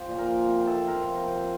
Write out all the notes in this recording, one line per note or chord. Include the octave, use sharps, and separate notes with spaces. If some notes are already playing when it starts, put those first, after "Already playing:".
Already playing: F3 G4
A#2
A#4
F3
C3
C3 A4
F3 A#4
C3
C3